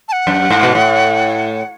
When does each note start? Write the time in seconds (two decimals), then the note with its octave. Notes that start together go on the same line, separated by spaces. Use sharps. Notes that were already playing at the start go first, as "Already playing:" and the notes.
0.08 A5
0.12 F#5
0.27 F#2
0.51 G#2
0.63 B2
0.75 A2